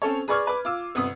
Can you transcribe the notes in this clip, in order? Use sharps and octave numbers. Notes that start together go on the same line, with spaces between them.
C4 C#4 A4 C#5
G#4 B4 D5 C#6 F6 G#6
B4 D6
F4 D6 E6
G1 C3 B3 D#6